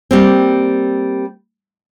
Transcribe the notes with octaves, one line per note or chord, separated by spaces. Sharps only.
G3 A#3 C4